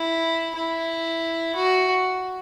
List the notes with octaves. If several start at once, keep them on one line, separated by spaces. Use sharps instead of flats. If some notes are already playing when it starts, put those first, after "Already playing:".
Already playing: E4
E4
F#4